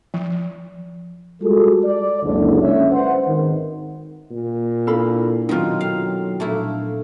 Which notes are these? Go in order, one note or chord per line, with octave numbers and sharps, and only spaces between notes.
F3
G3 G#3 F4 F#4 G#4 A4
D5
F#1 C#2 D3
G#3 C#4 E5
B4 C5 F#5
G#1 D#3
A#2
D4 E4 A4 F5 B5
B2 D#3 F#3 C4 D#4 F4
A4 F5 G5
A#2 F3 A3 A#3 D4 E4